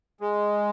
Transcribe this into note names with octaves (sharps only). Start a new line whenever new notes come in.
G#3